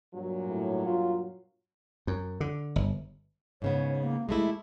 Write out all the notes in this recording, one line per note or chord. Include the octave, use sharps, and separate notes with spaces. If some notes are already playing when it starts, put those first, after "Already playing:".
G2 A#2 F#3
A2
F4
F#2
D3
G1
G#2 C#3 B3 C#5
A#3
G#3 A3 E4 G4